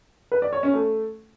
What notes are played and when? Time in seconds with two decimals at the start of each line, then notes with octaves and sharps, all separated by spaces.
0.32 B4
0.42 D5
0.53 C#5
0.63 C#4
0.74 A3